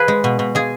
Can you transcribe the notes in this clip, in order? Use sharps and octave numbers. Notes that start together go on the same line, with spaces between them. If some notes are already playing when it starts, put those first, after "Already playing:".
Already playing: G#4 B4
G#3
B2
B2
G#3 G#4